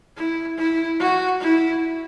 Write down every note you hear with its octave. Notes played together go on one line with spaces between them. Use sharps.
E4
E4
F#4
E4